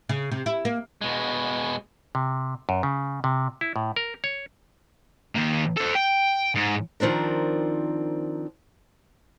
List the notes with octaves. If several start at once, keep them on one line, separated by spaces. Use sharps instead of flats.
C#3
C3
E4
A#3
B2 G#3
C3
F#2
C#3
C3
E4
A2
A#4
C#5
D#3 A#3
A4 C5
G5
G#2
D#3 F3 C4 D4 A#4